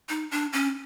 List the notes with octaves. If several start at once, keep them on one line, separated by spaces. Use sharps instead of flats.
D#4
D4
C#4